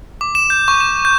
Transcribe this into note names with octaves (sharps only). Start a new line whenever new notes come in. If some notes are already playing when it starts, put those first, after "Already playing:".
D6
E7
G6
C#6
E7
G6